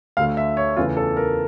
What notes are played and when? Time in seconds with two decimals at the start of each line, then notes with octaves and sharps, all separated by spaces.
0.17 D2 D3 A3 F5
0.37 E5
0.57 C#5
0.77 E2 C#3 E3 A3 F4
0.97 A4
1.17 A#4